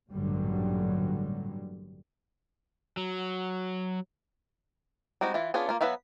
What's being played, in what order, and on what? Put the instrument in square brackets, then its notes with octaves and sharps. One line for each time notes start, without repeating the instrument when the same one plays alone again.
[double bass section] A1 G2 A#2 D3 F#3 G3
[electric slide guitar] F#3
[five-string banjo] G3 G#3 C4 D#4 F#4
E3 E4 F4
B3 C#4 D4 F4 G#4
A#3 F4
F#3 B3 B4 E5 F5